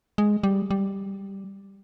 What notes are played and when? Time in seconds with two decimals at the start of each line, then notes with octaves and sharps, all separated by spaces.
0.18 G#3
0.43 G3
0.71 G3